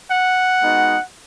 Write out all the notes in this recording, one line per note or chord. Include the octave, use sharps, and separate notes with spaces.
F#5
G#3 B3 D#4 F#4